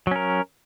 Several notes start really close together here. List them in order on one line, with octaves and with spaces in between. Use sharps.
F#3 C#4 A#4